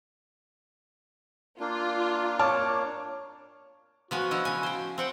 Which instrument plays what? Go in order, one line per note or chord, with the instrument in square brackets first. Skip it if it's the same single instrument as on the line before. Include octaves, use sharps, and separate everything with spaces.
[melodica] A#3 D4 [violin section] F4
[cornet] C#5 [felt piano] A5 D6 F6
[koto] F3 B3 G#5 [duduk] F#4
[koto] F3 E4 D#5
C#3 G#5
C5 G5
[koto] C4 F#5 G5 [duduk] C5